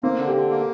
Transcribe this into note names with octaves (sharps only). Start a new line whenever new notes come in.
A#3 C4
D3
G4
D3
A#3